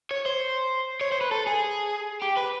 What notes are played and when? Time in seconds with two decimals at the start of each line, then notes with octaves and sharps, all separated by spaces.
0.11 C#5
0.26 C5
1.01 C#5
1.12 C5
1.21 B4
1.31 A4
1.47 G#4
2.22 G4
2.37 B4